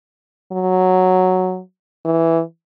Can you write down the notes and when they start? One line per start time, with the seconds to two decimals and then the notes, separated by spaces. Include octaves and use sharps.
0.52 F#3
2.05 E3